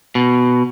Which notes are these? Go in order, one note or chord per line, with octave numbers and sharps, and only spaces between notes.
B2